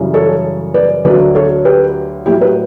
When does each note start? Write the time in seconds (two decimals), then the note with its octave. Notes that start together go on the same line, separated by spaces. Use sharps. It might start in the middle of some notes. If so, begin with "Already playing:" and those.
Already playing: F#2 C#3 E3 G3
0.14 A4 C#5
0.74 B4 D5
1.05 D2 D3 F#3 B4 D5
1.35 A4 C#5
1.65 G4 B4
2.26 A2 F#3 E4 G4
2.41 G4 B4